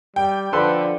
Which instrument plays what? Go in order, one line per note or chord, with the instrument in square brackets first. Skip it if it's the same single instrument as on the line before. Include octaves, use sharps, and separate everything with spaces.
[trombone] G3 [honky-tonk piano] G5
[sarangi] D3 [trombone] F3 [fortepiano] A4 B4 C6